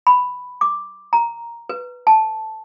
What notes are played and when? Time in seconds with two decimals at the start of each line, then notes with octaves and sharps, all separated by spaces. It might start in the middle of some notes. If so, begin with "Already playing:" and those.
0.07 B5
0.61 D6
1.13 A#5
1.69 B4
2.07 A5